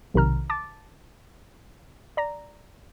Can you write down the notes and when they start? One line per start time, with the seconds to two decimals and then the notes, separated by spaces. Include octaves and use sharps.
0.14 B1 C3 D#3 A#5 F6
0.50 A5 D6 A6
2.17 D5 A#5 A#6